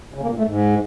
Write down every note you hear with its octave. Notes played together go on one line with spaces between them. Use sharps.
C#3
A#3
A#2
A3
G#2